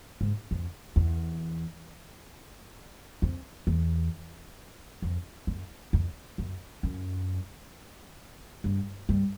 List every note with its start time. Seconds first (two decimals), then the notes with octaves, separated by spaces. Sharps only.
0.21 G#2
0.51 F2
0.96 E2
3.22 F2
3.67 E2
5.02 F2
5.47 F#2
5.93 F2
6.38 F#2
6.83 F#2
8.64 G2
9.09 G2